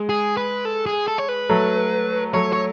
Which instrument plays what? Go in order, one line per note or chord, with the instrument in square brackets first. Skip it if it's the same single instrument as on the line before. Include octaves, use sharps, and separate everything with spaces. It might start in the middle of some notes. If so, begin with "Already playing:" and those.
Already playing: [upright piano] G#3
[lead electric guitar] G#4
B4
A4
G#4
A4
C#5
B4
[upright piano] F#3 A3
[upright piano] F#3 A3 [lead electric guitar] C#5
[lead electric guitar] C#5